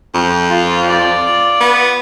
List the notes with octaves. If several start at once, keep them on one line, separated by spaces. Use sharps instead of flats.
F2
F4 F5
F4 D5
B3